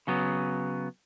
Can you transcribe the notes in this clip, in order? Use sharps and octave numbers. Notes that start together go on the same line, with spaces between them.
C#3 F#3 B3